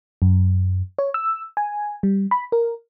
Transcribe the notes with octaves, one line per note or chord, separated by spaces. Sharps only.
F#2
C#5
E6
G#5
G3
B5
A#4